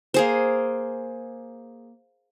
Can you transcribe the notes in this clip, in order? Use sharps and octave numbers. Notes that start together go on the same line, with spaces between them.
A#3 G#4 C5